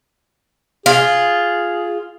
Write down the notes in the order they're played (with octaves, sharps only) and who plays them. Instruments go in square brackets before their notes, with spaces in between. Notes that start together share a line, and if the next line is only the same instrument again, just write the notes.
[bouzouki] F4 [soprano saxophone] G#4